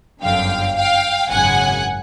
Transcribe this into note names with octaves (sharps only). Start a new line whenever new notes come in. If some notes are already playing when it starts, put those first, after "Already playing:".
G1 F#2 D3 F5 G5
F5 G5
G#1 F#2 C#3 F#5 G#5